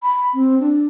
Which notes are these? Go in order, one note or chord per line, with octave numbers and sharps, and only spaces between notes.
B5
C4
D4